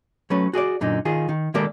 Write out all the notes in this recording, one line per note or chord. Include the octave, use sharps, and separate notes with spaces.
F#3 A3 C#4 B4
F#4 G#4 C#5 D5
F#2 A#2 D3 D#4
D#3 F4 G#4
D#3
D#3 G#3 A#3 G4 A4 D5